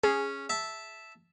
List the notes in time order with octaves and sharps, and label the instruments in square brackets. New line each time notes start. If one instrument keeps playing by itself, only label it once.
[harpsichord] C#4 [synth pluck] G#4
[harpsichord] E5 A5